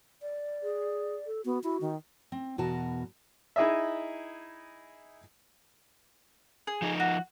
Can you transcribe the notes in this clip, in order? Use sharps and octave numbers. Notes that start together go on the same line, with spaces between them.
D5
G#4
A4
B3 F#4
E4 F#4
D#3
C4
E2 B2 F#4 A#4 A5
D#4 E4 G#4 D#5 E5
G#4
F3 D#4
F#4